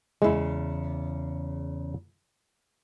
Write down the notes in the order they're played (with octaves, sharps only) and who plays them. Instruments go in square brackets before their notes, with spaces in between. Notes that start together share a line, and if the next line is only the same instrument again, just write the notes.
[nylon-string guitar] E2 C#3 [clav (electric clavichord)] G#3 E4